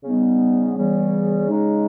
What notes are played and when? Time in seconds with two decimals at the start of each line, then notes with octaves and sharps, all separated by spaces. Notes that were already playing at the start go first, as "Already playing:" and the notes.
0.04 C#3 G3 B3 D#4
0.76 C#3 E3 G3 B3
1.48 C#3 G#3 D#4